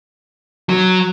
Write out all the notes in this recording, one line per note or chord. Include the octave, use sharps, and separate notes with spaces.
F#3